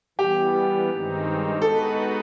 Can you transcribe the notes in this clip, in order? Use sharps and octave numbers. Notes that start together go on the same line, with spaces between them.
E3 G3 B3 G4
G2 D#3 G#3 C4 D#4
G#3 B3 D#4 F#4 A4 B4